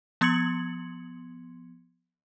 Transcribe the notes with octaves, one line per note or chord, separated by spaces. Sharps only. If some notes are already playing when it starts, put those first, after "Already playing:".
F3 B3 C6 G#6 C#7 F#7